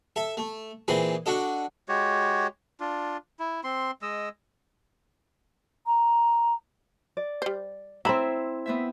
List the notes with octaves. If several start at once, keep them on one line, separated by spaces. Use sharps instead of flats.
A4 E5
A3
A#2 E3 C4 G#4 B5
D4 F#4 A4 D#5
G#3 F#4 G4 C#5
D4 F4
E4
C4 C6
G#3 D#5 E6
A#5
D5
G3 C5
E3 A3 C4 E4 E5 A#5 B5
B3 C4 E5